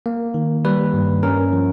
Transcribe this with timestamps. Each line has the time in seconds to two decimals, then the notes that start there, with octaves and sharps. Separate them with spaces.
0.06 A#3
0.34 D#3
0.65 G3 B4
0.94 G2
1.23 C#4 A#4
1.53 F3